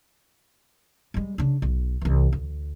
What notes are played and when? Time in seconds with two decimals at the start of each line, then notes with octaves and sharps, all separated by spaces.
1.14 G3 G#3
1.38 C#3 D4
1.62 B1
2.01 C2 E3
2.33 D2